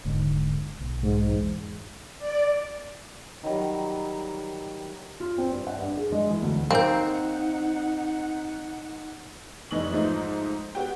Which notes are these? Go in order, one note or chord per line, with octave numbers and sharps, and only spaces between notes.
D#1 G#2 D3
B1
G#2
E2
D5
D#3 F#3 G3
F4
C4
G2
F#5
G2
G#4
G#3
E3
D2
A#3 C4 D#4 F5 F#5 G6
F1 E3 D#4 C#6 F#7
G#2 F3 A3 D#4
B3 F#4 G4 G5